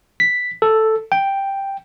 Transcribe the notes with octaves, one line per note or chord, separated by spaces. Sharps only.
B6
A4
G5